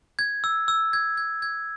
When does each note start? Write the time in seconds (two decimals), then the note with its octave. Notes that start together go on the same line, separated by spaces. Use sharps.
0.19 G#6
0.44 E6
0.68 E6
0.93 G#6
1.17 G#6
1.42 G#6